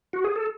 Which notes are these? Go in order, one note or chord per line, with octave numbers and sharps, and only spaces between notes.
F#4
G#4
A4